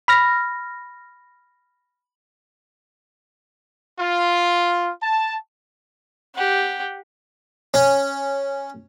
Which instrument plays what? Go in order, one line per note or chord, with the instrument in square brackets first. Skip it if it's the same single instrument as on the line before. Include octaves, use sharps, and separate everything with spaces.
[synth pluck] B5 F6 A#6
[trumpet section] F4
A5
[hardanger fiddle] G4 F#5
[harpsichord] C#4